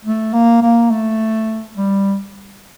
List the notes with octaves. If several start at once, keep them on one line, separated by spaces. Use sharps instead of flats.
A3
A#3
A#3
A3
G3